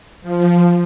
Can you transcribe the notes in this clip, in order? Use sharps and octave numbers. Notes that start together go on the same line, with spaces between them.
F3